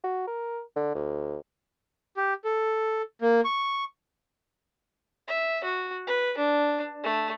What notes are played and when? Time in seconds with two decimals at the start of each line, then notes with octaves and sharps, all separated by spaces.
0.04 F#4
0.27 A#4
0.76 D3
0.95 D2
2.17 G4
2.44 A4
3.21 A#3
3.45 C#6
5.28 E5
5.64 F#4
6.07 B4
6.38 D4
7.03 A3